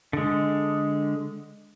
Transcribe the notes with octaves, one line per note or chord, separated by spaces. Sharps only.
D3 G#3